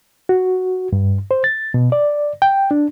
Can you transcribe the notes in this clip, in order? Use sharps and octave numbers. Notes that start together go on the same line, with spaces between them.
F#4
G2
C5
A6
B2
D5
G5
D4